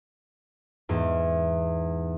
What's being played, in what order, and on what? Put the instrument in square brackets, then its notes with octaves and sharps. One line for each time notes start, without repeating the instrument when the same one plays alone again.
[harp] E2 G#2